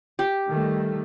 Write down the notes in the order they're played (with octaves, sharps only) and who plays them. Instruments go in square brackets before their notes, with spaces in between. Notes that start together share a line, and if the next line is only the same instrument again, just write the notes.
[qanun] G4
[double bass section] D#3 G3 A3